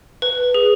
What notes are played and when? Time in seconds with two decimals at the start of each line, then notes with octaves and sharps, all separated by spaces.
0.22 B4
0.54 G#4